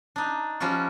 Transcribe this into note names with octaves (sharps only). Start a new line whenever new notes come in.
D4 D#4
F3 G3 C#4 F4 F#4